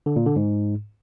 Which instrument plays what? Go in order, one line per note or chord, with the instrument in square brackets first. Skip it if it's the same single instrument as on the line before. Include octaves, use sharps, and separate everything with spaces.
[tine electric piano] D3
A#2
D3
G#2